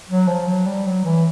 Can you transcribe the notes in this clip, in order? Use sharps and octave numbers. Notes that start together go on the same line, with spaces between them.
F#3
F3
F#3
G3
F#3
E3